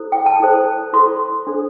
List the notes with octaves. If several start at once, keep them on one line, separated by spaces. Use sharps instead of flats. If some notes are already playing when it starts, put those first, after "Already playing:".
Already playing: E4 A4 C5
G5
A5
E4 A4 C5
E4 A4 C5 C6
D4 A4 C5